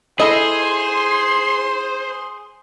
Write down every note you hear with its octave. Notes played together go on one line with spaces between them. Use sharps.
E4 G#4 A4 C5 D#5 C6